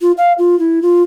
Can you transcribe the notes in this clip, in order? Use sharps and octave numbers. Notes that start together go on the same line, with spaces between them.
F4
F5
F4
E4
F4